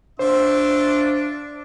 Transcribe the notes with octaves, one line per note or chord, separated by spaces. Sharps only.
D4 F4 C5 E5